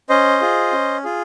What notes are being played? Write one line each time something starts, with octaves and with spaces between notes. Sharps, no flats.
C#4 C5 D#5
F4 G#4
C#4
F4 G#4